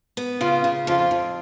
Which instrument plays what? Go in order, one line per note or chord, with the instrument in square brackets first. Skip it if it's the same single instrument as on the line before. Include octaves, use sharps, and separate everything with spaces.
[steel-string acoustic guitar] B3
[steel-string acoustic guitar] C#3 [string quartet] F4
[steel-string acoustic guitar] C#3
[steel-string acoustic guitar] F2 [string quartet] F4
[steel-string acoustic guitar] F2